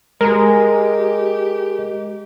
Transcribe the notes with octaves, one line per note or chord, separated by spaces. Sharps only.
G#3 G4 A#4 A#5